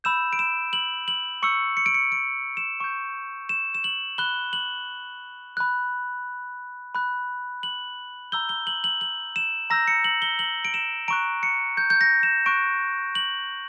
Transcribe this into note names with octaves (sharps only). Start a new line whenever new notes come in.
B5 E6 G6 E7
D7
E7
F#7
F#7
C#6 E6 G6 C#7
C#7
D7
C#7
D7
E7
C#6 G6
E7
E7
F#7
B5 F#6 G7
F#7
B5 F#6
B5 F#6
F#7
A#5 E6 G6 G7
G7
F#7
F#7
F#7
E7
A#5 E6 G6 A#6
C#7
F#7
G7
F#7
D7
E7
A#5 C#6 F#6 D7
C#7
G6
G6
A#6
E7
C#6 F#6 D7
F#7